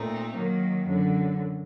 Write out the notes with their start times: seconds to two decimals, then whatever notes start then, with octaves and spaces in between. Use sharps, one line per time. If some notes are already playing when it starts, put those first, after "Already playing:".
Already playing: A#2 A3 C4 D#4
0.36 D#3 F#3 A#3
0.86 F#2 D3 F#3